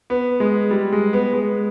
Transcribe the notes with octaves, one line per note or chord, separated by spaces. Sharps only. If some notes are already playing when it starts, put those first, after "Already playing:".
B3
G#3
G3
G#3
B3
G#3